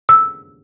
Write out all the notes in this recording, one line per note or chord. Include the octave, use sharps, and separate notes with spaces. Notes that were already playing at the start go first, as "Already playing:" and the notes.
E6